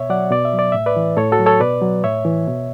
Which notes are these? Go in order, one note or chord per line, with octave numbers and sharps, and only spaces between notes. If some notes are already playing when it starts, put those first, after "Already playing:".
Already playing: B2 C#5 E5
F#3 D5 F#5
B2 D5
E5
F#3
D5
A2 E5
B4 D5
E3
A2 A4 C#5
F#4 A4
F#3
A4 C#5
B2 B4 D5
F#3
A2 C#5 E5
E3
B2